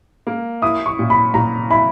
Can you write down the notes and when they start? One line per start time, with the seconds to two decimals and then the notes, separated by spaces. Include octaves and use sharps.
0.27 A#3
0.62 E4 D#6
0.86 C#6
0.99 A#2
1.10 B5
1.34 A#2 A#5
1.71 E4 B5